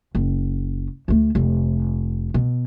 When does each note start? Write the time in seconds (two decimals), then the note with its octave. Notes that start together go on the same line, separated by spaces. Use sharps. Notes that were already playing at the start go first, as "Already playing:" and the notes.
0.15 F#1
1.08 D2 A3
1.35 F1
2.34 B2